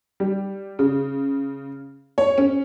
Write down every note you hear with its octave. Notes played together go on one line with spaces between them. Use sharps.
G3
C#3
C#5
C#4